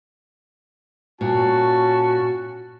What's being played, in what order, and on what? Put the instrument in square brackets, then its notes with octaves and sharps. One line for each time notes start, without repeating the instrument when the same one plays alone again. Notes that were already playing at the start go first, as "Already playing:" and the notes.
[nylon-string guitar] A#2 [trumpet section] C#4 A5 [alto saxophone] F#4